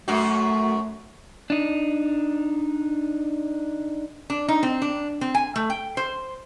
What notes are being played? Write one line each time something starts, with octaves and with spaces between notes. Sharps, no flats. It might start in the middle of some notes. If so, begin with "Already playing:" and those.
F#2 A3 F#4
D4 D#4
D4
D#4
C4
D4
C4
G#5
A3
G5
C5